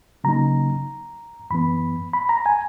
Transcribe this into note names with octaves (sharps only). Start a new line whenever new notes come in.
C#3 F#3 A#3 D#4 A#5
F#2 E3 B3 B5
B5
A#5
G#5